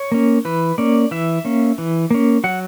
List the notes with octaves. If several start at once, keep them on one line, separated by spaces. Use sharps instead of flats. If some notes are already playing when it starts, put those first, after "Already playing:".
Already playing: C#5
A#3 C#4
E3 B4
A#3 C#4 D5
E3 E5
A#3 C#4
E3
A#3 C#4
F#3 F#5